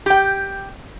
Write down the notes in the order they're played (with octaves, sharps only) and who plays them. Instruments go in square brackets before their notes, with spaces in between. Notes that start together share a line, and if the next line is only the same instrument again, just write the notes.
[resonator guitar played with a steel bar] G4 G5